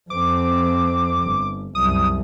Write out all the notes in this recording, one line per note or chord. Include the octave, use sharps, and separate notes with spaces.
F2 C4 D6
G1
C2 F#2 D#6